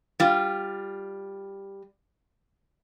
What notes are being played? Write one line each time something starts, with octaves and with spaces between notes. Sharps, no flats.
G3 F4